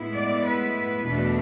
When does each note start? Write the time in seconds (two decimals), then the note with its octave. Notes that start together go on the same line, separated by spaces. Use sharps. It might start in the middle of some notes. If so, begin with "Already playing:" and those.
Already playing: A2 G#3 B3 E4
0.16 D5
0.46 B4
1.04 E2 B2 A3 D4